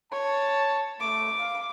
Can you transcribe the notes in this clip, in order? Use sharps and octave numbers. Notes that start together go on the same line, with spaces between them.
C#5 A5
A3 D6
F5